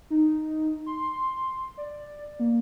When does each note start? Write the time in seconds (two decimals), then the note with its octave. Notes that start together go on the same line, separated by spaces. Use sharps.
0.10 D#4
0.86 C6
1.78 D5
2.39 A#3